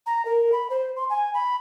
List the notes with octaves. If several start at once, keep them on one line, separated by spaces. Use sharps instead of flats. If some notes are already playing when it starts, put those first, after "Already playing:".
A#5
A#4
B5
C5
C6
G#5
B5